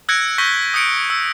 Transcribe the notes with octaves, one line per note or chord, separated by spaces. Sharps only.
E6 F#6 G#6 A#6 C#7 D7
C#6 E6 G6 A#6 B6 G7
D#6 G6 C#7 D7
E6